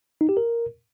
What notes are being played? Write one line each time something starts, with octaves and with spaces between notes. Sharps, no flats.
D#4
G4
A#4